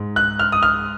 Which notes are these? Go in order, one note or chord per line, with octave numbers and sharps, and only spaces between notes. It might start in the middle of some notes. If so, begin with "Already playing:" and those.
Already playing: G#2
F#6
F6
D#6
F6